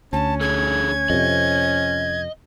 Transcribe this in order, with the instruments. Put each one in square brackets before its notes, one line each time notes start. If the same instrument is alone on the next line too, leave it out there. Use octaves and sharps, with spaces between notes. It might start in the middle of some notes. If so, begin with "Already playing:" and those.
[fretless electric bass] D2 [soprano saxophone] C#4 [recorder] A5
[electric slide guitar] D4 G#4 A4 [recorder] G#6
[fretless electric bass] F2 C3 [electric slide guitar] D#5